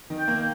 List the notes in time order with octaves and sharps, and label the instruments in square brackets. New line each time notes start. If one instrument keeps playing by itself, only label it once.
[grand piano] D#3
[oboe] G5
[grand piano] A#3